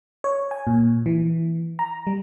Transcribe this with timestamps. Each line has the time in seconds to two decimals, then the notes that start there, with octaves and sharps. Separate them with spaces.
0.24 C#5
0.51 G#5
0.67 A#2
1.06 E3
1.79 A#5
2.07 G3